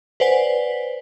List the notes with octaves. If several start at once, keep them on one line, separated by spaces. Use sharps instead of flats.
B4 C5 D5 F#5 G#5 B6